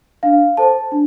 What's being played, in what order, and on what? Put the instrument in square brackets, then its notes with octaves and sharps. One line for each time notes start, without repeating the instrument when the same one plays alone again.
[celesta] D4 F5
A4 C5 A5
D4